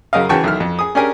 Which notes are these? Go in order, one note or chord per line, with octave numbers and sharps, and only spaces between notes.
F#2 C#3 A#4 D#5 F5
C#3 E3 F#4 G5 A5 C#6
B1 D#3 E4 F6
F2
G#4 D#6
C#4 D4 G4 G#4 A#4 G#5